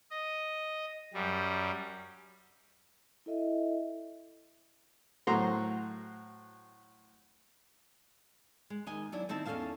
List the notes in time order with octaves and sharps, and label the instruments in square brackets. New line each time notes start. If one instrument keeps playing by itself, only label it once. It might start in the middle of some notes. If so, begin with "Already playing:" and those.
[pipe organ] D#5
F#2 G3
[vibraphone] E4 A4 D#5 E5
[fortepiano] A2 F#3 C5 F#5 A#5 C6
[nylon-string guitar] G#3
D#2 D#5 G#5
F#3 D4 E4
D#3 C4 E4 E5 A5
E2 C#4 A4 E5 F5 A5